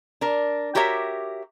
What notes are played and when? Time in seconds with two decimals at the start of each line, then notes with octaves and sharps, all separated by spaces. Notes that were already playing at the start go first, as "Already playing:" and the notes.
0.21 D4 A#4
0.75 F#4 G4 A#4 C#5 E5